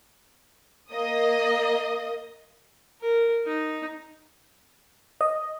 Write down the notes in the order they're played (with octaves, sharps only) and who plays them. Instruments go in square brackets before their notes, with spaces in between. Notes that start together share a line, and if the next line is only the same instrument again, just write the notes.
[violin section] A#3 D#5 D#6
[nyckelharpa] A#4
D#4
[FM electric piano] D#5